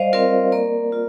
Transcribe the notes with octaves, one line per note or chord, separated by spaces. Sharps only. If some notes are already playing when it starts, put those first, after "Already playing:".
Already playing: G3 C5 D5 D#5 F5
C4 F4 A#4 D5
A#3 A#4 D5
F4